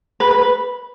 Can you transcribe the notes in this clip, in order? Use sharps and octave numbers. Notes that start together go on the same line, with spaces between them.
B4
B4
B4